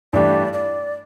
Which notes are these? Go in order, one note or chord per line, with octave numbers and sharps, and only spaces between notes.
G2 E3 A3 D4 G4 D5
D5